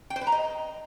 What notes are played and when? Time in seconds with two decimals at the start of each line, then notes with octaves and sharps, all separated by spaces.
0.10 G5
0.16 C5
0.21 B4
0.27 A#5
0.32 D#5